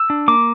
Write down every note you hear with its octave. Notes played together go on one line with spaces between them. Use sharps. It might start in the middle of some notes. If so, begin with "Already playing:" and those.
Already playing: E6
D4
A#3 D6